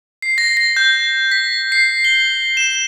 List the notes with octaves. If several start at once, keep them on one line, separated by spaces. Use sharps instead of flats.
C7
A#6
A#6
G6
B6
C7
G7
E7